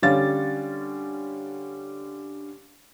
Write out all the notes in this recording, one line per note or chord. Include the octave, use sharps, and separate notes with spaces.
D3 G3 C#4 F5 A6